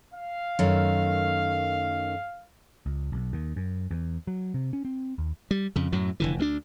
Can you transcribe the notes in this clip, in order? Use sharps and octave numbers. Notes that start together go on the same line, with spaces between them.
F5
F#2 D#3 A3
C#2
B1
D#2
F#2
E2
F#3
C3
C#4
C4
D#2
G3
F2 C#3
F#2 A2 F#3
F1 D3 E3
D2 F3 D4